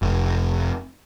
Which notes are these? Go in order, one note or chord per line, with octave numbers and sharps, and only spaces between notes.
F1